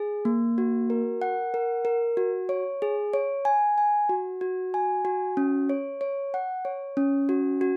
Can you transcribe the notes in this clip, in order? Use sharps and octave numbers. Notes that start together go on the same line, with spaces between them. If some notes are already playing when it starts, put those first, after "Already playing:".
Already playing: G#4
A#3
F#4
A#4
F#5
A#4
A#4
F#4
C#5
G#4
C#5
G#5
G#5
F#4
F#4
G#5
F#4
C#4
C#5
C#5
F#5
C#5
C#4
F#4
F#4